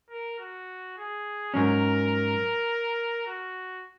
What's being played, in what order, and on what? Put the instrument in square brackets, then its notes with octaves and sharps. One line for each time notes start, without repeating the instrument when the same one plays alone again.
[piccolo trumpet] A#4
F#4
G#4
[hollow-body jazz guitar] G#2 F#3 C#4 [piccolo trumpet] A#4
[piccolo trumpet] F#4